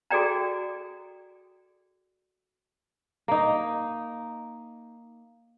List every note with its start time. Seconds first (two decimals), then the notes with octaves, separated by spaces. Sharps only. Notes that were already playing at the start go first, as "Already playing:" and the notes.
0.10 F#4 G#4 A4 D5 G5 A#5
3.28 A#3 D#4